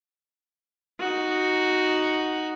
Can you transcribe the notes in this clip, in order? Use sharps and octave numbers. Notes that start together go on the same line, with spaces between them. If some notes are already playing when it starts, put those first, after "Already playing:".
D#4 F#4